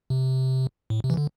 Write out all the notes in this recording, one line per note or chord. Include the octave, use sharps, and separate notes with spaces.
C3
A2
C3
E3
D3